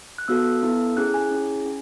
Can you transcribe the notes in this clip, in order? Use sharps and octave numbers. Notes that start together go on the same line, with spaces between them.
F#6
B3 F#4 A4 E6
B3 E4 A4
C#4 E4 G#4 F#6
G#5
C#4 E4 G#4
C#4